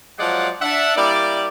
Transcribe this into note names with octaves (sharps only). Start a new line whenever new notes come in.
F3 F#3 G#3 D5 F5 F#5
D4 E5 F#5
G3 A#3 E4 D5